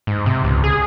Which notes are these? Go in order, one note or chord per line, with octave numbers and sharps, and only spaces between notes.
G#2
C3
C#2
G#4